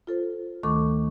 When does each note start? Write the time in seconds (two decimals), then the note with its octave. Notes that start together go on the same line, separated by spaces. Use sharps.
0.07 F4 A4 C5
0.63 D2 D#3 A3 A4 C#6 D6